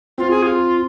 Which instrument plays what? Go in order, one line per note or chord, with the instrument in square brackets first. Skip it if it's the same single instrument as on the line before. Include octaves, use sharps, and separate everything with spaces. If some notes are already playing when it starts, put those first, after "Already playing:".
[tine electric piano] C4 [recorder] F4
[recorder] G#4
F4